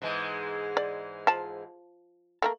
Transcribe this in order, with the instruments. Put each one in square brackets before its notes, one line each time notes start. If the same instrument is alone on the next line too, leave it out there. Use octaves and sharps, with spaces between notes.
[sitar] G#2 E3 G#3
[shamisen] D5
F3 A5
A3 A#3 A#4